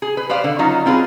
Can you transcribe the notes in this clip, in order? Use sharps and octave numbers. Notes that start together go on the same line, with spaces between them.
G#4
B4
B4 C5 D5 F5
D3
F#3 C#4 D#4 F4
C4 F4 G#4 B4